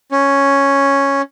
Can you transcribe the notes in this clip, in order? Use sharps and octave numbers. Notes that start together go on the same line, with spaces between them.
C#4